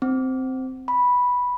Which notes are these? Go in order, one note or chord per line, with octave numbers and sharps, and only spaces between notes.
C4
B5